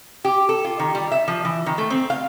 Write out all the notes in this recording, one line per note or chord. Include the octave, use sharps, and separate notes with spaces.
G4
A4
F4
D#3
G3
E5
F3
E3
D#3
A3
C4
F5